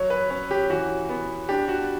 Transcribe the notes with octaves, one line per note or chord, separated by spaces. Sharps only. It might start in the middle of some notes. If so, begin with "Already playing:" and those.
Already playing: F#3 C#5
B4
C#4
G4
E3 F#4
B3
D4 G4
F#4